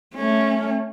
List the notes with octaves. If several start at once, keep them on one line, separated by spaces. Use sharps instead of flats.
A3 C#4